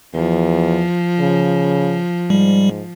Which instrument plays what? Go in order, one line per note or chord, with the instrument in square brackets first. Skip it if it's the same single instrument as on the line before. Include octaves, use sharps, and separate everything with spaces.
[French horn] E2 [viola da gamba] F3
[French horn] C#3
[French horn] G#2 [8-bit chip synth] G3